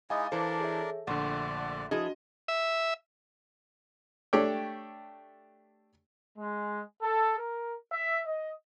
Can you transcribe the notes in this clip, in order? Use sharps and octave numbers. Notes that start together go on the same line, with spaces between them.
G#3 D#4 E4 D#5 F5 G#5 D6 A6
E3 D4 A4 A#4 C5 D5
G#4 C#5 E5
A#1 D3 A3 D5 F#5 C6 C#6
F3 D4 E4 F#4 G#4 D#5
E5
A3 D4 G4 A4 C#5 G5
G#3
A4
A#4
E5
D#5